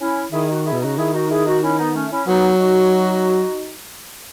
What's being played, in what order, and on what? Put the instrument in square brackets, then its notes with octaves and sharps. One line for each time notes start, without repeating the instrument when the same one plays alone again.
[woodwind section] C#4 E4
[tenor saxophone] D#3 [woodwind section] E4 G#4
[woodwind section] D#4 F#4
E4 G#4
[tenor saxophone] B2
[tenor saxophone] C#3 [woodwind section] D#4 F#4
[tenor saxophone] D#3 [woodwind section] E4 G#4
[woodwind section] D#4 F#4
E4 G#4
D#4 F#4
C#4 E4
B3 D#4
A3 C#4
C#4 E4
[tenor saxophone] F#3 [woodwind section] B3 D#4
[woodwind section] D#4 F#4